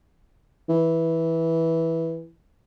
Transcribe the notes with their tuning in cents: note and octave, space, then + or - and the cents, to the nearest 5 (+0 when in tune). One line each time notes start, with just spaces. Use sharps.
E3 -10